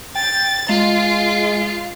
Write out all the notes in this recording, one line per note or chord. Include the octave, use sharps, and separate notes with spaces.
G5 A6
G#3 F4